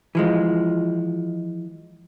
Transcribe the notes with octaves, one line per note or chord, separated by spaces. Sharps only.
E3 F3 G#3